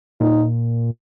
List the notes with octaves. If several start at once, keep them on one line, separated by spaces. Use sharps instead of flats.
A#2 D#4